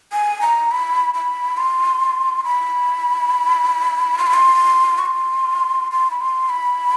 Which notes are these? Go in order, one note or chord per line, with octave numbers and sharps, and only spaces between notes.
G#5
A#5
B5
B5
C6
B5
C6
B5
C6
C#6
C6
C6
B5
C6
B5